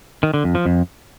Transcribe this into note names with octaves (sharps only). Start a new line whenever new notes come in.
D#3
D3
F2
F3
F2